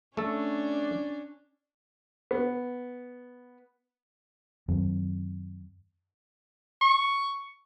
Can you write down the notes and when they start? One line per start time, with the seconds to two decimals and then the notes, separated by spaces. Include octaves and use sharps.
0.17 A3 C#4 D4 A4 D5
2.31 B3
4.68 F#2 D#3 F#3 C4
6.81 C#6